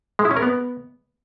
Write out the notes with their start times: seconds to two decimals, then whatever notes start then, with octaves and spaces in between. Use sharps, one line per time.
0.19 G#3
0.25 E4
0.31 C#4
0.37 A#4
0.42 B3